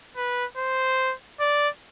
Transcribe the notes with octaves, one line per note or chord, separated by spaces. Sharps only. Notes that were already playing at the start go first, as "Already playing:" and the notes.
B4
C5
D5